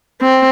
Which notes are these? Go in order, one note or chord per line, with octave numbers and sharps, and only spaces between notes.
C4